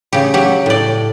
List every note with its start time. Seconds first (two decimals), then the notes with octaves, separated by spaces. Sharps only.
0.13 C#3 G4
0.34 F#3 G4
0.66 A2 D5